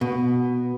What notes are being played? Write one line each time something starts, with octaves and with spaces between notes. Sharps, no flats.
B2